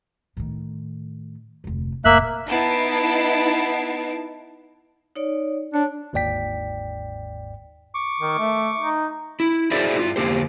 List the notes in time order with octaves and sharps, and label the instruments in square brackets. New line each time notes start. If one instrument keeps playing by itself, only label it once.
[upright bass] A2 D#3
F1 D2
[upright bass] F1 A2 [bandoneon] A#3 E5 F#6
[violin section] B3 D#4 E4 A5 C7 D7
[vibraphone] D#4 C#5 D5
[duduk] D4 [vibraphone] C#5 D5
[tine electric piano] G1 D#2 G#2 D5 G5 B6
[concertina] C#6 D6
[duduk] D#3
A3
D#4
[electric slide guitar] E4
E4 F#4 G#4 C5 D5 E5
G2 F4
F2 D3 A#3 G4 C5